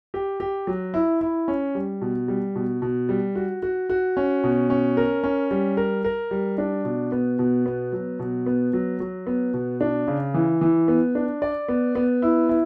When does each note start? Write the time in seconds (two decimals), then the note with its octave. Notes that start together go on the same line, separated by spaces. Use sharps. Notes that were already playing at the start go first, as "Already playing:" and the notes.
0.14 G4
0.40 G4
0.67 F#3
0.94 E4
1.21 E4
1.48 C#4
1.75 G3
2.01 B2
2.28 G3
2.55 B2
2.82 B2
3.09 G3
3.35 F#4
3.63 F#4
3.90 F#4
4.17 C#4
4.44 B2
4.70 C#4
4.97 A#4
5.24 C#4
5.51 G3
5.77 A#4
6.04 A#4
6.31 G3
6.58 D4
6.85 B2
7.12 B3
7.39 B2
7.66 B3
7.92 F#3
8.19 B2
8.46 B3
8.73 F#3
9.00 F#3
9.27 B3
9.54 B2
9.81 D4
10.08 C#3
10.34 E3
10.61 E3
10.88 B3
11.15 D4
11.42 D5
11.68 B3
11.95 B3
12.22 E4
12.49 E4